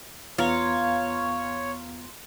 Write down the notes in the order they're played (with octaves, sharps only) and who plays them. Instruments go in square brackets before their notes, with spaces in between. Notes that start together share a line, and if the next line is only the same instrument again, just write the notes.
[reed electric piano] E2 B3 A#5 [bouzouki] F4 [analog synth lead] C#5